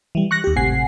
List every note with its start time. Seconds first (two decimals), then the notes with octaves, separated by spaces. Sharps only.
0.15 E3 G3
0.31 C#6 F#6 A#6
0.44 D#2 G4
0.56 G#1 A2 C3 F#5 G#5 C7